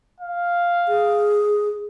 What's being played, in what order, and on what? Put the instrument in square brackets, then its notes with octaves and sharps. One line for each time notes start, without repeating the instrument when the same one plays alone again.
[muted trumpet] F5
[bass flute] G#4